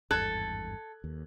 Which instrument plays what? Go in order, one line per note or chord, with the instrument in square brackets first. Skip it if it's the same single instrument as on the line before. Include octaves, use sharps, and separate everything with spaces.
[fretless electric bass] G#1 E2 G2 [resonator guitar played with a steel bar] A4 [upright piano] F#6 G#6
[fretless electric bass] D#2